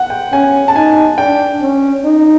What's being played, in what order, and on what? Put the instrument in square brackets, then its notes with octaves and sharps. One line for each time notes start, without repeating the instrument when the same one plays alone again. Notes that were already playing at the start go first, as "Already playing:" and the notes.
Already playing: [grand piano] F#5
G5
[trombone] C#4 [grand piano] G#5
[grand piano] A5
[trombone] D#4 [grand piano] G#5
[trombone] D4 [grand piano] G5
[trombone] C#4
D#4